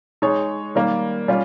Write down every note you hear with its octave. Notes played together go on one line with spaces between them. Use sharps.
G#3 D#4 G#4 C#5
D#3 G3 A#3
G3 C#4 F4